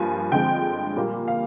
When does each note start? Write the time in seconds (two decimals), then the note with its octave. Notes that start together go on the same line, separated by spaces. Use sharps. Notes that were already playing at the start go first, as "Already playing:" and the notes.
Already playing: G2 F3 A#3 G#5
0.31 D3 F3 G#3 C4 G5
0.96 A#2 G3 A#3
1.28 F5